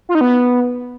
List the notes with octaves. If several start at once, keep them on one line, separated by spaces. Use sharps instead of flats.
F4
D#4
B3